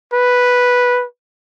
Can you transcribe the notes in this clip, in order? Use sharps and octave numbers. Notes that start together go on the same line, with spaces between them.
B4